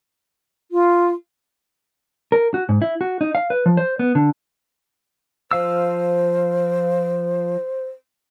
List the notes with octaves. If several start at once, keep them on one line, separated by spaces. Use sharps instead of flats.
F4
A#4
F#4
G#2
E4
F#4
D#4
F5
B4
F3
C5
B3
D3
F3 C5 F5 E6